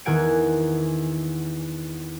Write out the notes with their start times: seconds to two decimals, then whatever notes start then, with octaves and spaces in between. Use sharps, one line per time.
0.05 E2 D#3 F#5 G#5 G#6 D7